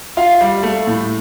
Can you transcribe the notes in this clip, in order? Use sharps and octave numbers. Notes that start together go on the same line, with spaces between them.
F4 F5
G3
A3
A2